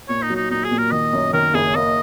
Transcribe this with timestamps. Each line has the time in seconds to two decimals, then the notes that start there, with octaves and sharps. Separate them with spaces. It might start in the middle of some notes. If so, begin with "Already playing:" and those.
0.09 A#2 C#5
0.23 D#4
0.30 F#3
0.36 D#4
0.51 A#2 D#4
0.64 G#4
0.71 A#2
0.78 A#4
0.92 D#3 D#5
1.13 F#2
1.33 D#3 A#4
1.54 F#1 G#4
1.75 A#3 D#5